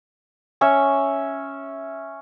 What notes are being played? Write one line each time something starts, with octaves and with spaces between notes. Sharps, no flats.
C#4 C#5 E5